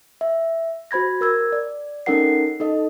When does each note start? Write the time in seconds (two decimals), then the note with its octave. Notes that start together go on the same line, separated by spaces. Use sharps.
0.21 E5
0.91 F#4 C5 B5 G#6 A#6
1.21 A#4 E6 G#6
1.52 D5
2.06 C#4 D#4 A4 A#4 F#5 C7
2.60 D#4 A4 D#5